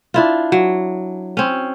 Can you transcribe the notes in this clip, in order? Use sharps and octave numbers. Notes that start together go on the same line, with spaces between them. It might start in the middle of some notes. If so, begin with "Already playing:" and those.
D4 E4 F4
F#3
C4 C#4